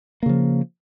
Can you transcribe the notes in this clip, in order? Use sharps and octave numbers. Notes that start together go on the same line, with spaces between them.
C#3 F3 A#3